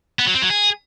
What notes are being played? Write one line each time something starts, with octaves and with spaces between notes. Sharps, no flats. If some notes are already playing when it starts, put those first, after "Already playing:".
B3
F#3
C4
F#3
G#4